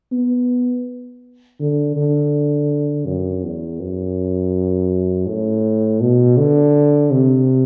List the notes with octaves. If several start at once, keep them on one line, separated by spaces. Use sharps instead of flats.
B3
D3
D3
F#2
E2
F#2
A2
B2
D3
C3